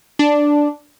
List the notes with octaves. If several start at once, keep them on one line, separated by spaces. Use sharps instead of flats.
D4